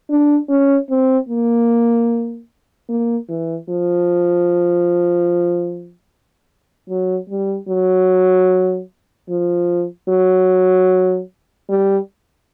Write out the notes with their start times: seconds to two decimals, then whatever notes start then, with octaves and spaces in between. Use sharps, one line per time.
0.09 D4
0.49 C#4
0.90 C4
1.29 A#3
2.89 A#3
3.29 E3
3.69 F3
6.89 F#3
7.30 G3
7.69 F#3
9.29 F3
10.09 F#3
11.70 G3